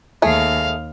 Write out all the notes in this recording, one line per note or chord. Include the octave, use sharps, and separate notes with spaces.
D#2 A3 G#4 F5